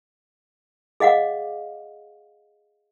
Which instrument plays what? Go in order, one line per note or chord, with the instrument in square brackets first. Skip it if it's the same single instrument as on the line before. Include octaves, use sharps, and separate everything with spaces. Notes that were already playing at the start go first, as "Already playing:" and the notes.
[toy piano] G#4 D#5 F5 F#5 D6